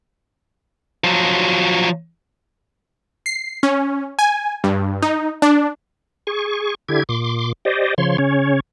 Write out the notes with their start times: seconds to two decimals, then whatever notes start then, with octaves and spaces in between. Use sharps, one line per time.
1.04 F3 F#3
3.26 C7
3.63 C#4
4.19 G#5
4.64 G2
5.03 D#4
5.42 D4
6.27 G#4 C#6
6.89 D3 E4 G4 G#6
7.09 A#2 C6 D6
7.65 G4 C5 D5 D#5
7.98 C#3 F3 C#5 C6
8.18 C#3 C#4 C#5